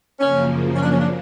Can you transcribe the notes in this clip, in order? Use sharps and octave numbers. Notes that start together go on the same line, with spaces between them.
F#2 C#3 F3 A#3 C#4
C#4
D4
C#4
D4